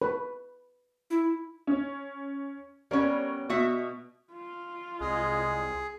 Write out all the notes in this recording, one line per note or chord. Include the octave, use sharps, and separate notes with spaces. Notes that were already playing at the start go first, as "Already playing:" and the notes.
B4
E4
C#4
G3 B3 C#4 A#4 C#5
B2 F#4 E5
F4
C2 G#3 G#4